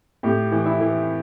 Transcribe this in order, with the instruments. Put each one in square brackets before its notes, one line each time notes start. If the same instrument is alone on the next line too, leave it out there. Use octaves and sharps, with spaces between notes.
[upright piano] A2 G4
E3
E4
E3